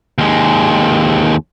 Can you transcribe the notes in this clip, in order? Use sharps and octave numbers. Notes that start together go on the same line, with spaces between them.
D#2 G#3